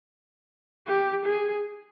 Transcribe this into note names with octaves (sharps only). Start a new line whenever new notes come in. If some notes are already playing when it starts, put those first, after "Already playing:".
G4
G#4